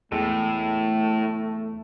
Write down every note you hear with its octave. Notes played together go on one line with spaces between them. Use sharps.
E2 A2 G#3 A3 A4